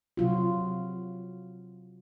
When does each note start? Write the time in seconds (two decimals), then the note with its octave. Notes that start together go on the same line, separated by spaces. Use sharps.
0.17 C3 F#3 F4 F#4